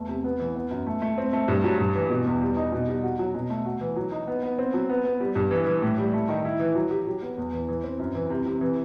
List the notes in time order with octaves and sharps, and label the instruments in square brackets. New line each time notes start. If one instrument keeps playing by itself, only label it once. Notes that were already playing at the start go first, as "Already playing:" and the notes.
Already playing: [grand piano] E2 A3
C3
B3
E3
B3
F#2
A3
A3
C4
A3
G2
F#3
G2
E3
B2
E2
G3
D#4
B2
G3
F#4
F#3
B2
A3
F#4
E3
F#3
D#4
B3
B3
C4
F#3
B3
B3
G3
G2
E3
E3
A2
G3
A3
D#3
E4
E3
F#3
G4
F#3
B3
E2
E3
E3
C4
F#2
E3
C3
C3
E3